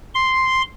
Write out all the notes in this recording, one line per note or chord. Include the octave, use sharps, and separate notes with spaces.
C6